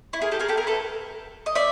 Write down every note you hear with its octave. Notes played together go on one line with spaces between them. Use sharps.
E4
G#4 A#4
G4 A4
G#4 A#4
G4 A4
G#4 A#4
A4 B4
D#5
D5 E5